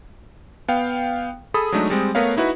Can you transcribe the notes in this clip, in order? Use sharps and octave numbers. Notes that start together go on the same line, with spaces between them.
B3 F5 G5
G#4 A4 B5 D#6
F#3 G#3 A3 D4 D#4
G3 G#3 C4
A3 B3 A#4 B4 C#5 F5
D#4 E4 F#4 B4